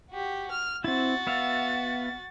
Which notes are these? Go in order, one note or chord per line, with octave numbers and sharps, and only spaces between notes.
F#4 G4
F6
C4 E4 F#4 A6
B3 E5 F5